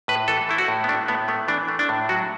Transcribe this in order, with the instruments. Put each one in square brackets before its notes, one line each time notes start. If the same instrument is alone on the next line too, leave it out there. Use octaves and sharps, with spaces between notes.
[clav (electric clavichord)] A2 B4
E3 A4
A3 E4
F#4
A2
B3
A3 D4
A2 B3
A3 B3
E3 D4
A3
D4
A2
F#3 F#4